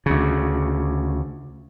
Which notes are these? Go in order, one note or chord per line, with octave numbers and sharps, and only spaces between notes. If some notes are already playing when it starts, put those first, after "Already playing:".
D2 C#3